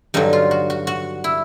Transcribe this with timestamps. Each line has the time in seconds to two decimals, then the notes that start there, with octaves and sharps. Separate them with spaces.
0.14 G2 D3 F#3 D#4
0.33 F4
0.51 F#4
0.70 F#4
0.87 F#4
1.24 E4